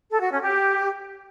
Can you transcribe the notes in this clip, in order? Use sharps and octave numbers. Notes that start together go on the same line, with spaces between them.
A4
F#4
C#4
G4